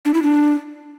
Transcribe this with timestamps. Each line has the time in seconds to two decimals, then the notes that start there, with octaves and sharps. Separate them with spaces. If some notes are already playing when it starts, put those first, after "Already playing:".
0.05 D4
0.14 E4
0.23 D4